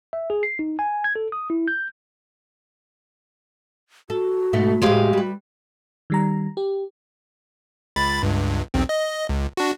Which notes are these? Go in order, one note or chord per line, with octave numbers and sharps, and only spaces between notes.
E5
G#4
C7
D#4
G#5
G#6
A4
D#6
E4
G6
F#4 A4
G#2 B2 A3
A2 G#3 G4 G#4 C5 F5
G3 B4
D#3 G3 A#5
G4
C#2 B5 A6
C#2 G2
B1 E2 C4
D#5
C#2
D4 F#4